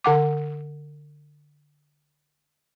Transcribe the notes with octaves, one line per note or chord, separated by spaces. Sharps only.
D3 F#5 D6